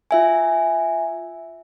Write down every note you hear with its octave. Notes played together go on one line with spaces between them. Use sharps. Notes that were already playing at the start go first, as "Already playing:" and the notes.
F4 E5 G#5